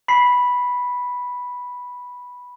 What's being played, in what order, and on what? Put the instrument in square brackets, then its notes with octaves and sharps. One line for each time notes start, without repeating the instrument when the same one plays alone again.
[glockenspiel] B5 B6 C7